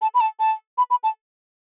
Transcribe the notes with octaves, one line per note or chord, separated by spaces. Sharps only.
A5
B5
A5
A5
B5
B5
A5